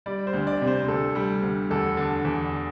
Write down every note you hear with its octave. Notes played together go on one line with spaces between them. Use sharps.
G3 D5
C5
D2
D5
C3
C5
D2 A4
G3
D2
E2 A4
D3
E2